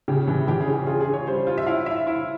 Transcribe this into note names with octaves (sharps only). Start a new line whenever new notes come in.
C#3 G4
E3
E3 G4
G#4
C#4
G4
F4 G#4
G#4
C#4
C#5
G3 C5
F4
E5
E4 F5
E4 E5
E4